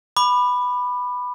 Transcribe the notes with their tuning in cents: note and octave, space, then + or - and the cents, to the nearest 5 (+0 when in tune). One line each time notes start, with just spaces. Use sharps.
B5 +0 D6 +35